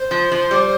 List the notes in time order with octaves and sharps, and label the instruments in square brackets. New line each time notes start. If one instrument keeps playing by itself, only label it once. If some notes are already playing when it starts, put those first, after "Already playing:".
Already playing: [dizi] C5
[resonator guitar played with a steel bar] F3
F3
G3